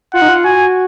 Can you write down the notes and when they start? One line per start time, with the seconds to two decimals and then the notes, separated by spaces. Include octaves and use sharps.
0.14 F4 F#5
0.22 D#4
0.28 F4
0.44 F#4 G#5